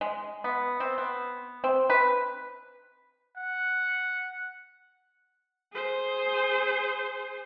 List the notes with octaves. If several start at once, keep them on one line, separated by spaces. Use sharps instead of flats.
G#3
B3
C4
B3
C4
B4
F#5
G#4 C5